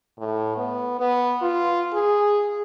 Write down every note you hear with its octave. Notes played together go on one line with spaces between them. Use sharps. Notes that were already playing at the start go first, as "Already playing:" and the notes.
A2
B3
B3
F4
G#4